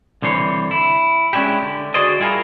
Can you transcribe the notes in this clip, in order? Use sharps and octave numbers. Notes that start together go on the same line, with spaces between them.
C2 D3 E3 C5 C#5
E4
G#3 C#4 D4 E4 G4
D3
F#4 G#4 C5 D5 D#5
G3 E4 F4 G#4 A#4